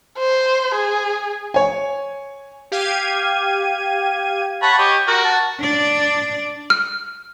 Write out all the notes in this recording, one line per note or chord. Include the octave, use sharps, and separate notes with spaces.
C5
G#4
C#5 G#5
G4 F5 G#6 D#7
C#5 F#5 A5 B5
G4 C#5 D#5
F#4 A#4 F#5
A5
D4 D5
F6